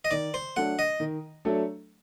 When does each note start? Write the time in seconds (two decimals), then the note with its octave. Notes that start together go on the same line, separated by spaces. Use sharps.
0.05 D#5
0.11 D#3 D5
0.34 C5
0.56 F#3 A3 D4 A4 F#5
0.79 D#5
1.00 D#3
1.45 F#3 A3 D4 A4